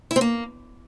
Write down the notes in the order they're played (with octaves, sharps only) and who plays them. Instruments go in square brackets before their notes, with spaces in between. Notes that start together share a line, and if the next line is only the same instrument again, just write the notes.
[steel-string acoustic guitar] E4
C4
A#3